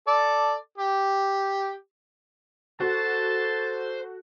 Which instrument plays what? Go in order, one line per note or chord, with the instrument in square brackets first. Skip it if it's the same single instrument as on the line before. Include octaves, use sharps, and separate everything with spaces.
[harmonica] A4 D5
G4
[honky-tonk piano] F#4 [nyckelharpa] A4 [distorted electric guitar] C5 [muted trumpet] A5